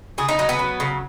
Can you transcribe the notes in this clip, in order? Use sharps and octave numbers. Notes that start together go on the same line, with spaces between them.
C#3 G#4
D#4
F#3 D#4
B3
F#3
C#3